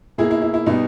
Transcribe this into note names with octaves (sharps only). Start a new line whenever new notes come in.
B2 A#3 E4 G#4
E4
E4
E4
B2 G3 B3 D#4